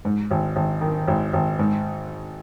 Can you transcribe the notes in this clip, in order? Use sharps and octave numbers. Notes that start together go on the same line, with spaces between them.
G#2
G#1
G#1
D#3
G#1
G#1
G#2